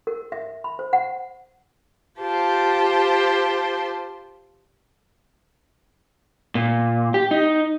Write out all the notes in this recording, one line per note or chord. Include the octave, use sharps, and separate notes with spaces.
A#4
E5
B5
C5
F#5
F4 G4 C5 A5
A#2
G4
D#4